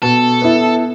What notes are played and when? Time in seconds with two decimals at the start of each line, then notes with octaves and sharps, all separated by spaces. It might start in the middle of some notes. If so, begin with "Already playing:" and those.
0.02 B2 A4
0.42 B3 E4